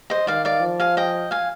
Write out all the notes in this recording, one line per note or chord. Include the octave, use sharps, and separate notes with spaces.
C5 D#5
D#3 D5 F5
D5 F5
F3
F5 G#5
D#5 G5
F5 G#5